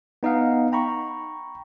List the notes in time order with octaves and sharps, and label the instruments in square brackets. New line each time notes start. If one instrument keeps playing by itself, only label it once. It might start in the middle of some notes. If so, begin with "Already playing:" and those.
[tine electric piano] B3 D#4 D#5 F5 F#5
G5 A#5 B5 C#6